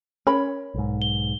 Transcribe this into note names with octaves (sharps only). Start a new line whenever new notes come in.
C#4 A#4 C#5 B5
B1 G#2
G7